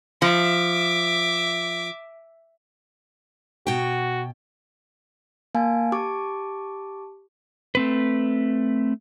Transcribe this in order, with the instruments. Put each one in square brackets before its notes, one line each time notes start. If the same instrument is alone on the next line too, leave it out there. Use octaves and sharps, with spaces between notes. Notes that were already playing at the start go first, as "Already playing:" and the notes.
[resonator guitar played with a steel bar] F3 [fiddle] E5 D6
[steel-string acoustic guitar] B2 G5 [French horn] F#4
[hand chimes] A#3 F5 G#5 A5
G4 A5 C#6 D6
[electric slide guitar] A3 C4 B4